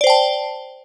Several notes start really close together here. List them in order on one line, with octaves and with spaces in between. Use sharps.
D5 C5 G5 A5